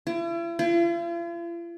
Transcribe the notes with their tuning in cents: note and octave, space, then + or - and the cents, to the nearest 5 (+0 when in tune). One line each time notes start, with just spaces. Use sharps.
E4 +40
F4 -45